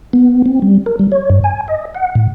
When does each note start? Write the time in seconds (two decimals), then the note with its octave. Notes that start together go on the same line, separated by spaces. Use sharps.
0.13 B3
0.46 C4
0.62 G3
0.86 A#4
0.99 G3
1.12 C#5
1.30 G2
1.44 G#5
1.68 D#5
1.95 F#5
2.15 A2